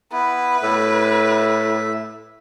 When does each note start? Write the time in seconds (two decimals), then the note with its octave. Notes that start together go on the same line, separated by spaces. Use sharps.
0.12 B3 E4 B4
0.63 A2 E5